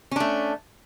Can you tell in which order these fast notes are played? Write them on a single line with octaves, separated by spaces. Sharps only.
C#4 D4 A3